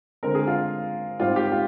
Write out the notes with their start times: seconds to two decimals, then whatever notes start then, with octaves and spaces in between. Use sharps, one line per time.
0.23 D3 G#3 C4 A#4
0.35 G#4
0.47 F4
1.20 G#2 G3 C4 F4
1.36 G4
1.52 F4